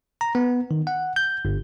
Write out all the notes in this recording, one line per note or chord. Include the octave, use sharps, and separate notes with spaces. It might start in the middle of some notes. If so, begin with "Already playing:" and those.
A#5
B3
D#3
F#5
G6
G1